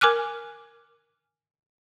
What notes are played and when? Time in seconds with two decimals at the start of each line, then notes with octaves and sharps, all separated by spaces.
0.01 A#4 G#5 D6 F6 F#6